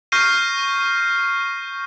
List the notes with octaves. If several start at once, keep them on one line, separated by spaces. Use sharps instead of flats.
C#6 F6 G6 A#6 C7 D#7